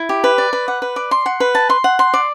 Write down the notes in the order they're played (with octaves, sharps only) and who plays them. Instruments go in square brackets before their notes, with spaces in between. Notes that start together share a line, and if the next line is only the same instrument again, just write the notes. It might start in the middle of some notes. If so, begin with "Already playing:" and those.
Already playing: [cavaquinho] E4
G4
B4
D5
B4
F#5
B4
D5
C6
F#5
B4
A5
C6
F#5
C6
D5